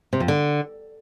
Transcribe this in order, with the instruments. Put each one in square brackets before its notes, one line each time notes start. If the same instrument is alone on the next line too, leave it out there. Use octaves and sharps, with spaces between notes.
[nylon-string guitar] C3
F2
D3